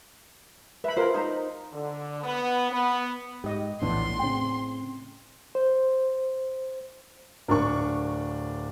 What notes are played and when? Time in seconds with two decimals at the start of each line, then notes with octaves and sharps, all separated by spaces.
0.84 B4 E5 B5
0.97 F4 G#4 A#4 C5
1.14 D#4 C5 A#5
1.73 D3
2.24 B3
2.71 B3
3.44 G#2 G4 D#5
3.82 A#1 E2 A2 E3 B3 D4 C6
4.19 A2 C#3 C4 G5
5.55 C5
7.48 D1 D4 A#4 C#6